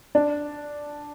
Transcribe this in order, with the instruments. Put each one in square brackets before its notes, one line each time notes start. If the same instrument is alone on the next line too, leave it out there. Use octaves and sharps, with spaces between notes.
[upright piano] D4